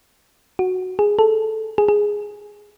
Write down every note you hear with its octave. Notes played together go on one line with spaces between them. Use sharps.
F#4
G#4
A4
G#4
G#4